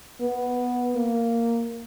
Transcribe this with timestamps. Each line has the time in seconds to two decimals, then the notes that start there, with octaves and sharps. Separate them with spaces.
0.21 B3
0.95 A#3